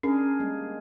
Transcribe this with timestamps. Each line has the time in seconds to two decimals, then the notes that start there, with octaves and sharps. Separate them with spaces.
0.03 C#4 D4 G#4 A#4
0.40 G3 G#3 A#3